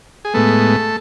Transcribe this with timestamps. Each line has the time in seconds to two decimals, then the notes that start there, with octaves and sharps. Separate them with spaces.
0.25 G#4
0.34 A2 G#3 A3 B3 A4